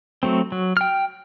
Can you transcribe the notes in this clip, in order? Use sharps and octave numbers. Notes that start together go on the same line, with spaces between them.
F#3 A3 C4
F#3
G5 F6